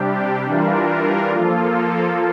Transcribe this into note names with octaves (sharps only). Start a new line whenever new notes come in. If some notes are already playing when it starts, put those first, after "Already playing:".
Already playing: C3 G3 D4 G4
E3 G3 D4 F4 A#4
F3 A#3 F4 A4